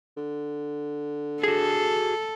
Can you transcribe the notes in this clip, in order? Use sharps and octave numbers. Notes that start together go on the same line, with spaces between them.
D3
F#4 G#4 A4